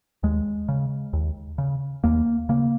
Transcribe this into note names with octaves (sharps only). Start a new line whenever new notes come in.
D#2 G#3
C#3
D#2
C#3
D#2 A#3
C#3 A#3